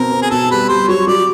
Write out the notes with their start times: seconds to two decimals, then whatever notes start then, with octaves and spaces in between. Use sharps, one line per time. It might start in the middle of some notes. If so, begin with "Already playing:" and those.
Already playing: B2 C4 A#4
0.12 C4
0.22 G#4
0.31 B2 A4
0.51 G3 B4
0.69 G3 C5
0.88 F#3 C#5
1.07 F#3 D5